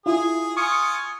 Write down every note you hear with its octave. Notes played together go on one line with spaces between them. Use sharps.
E4 F4 G#4
F4 G#5 C#6 D#6 C#7